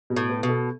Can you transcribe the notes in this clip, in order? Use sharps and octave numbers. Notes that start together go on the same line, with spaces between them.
B2
A2
B3
B2
A4